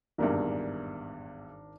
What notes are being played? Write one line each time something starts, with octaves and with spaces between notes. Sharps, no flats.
G#1 E2 G2 A#2 D4 A#4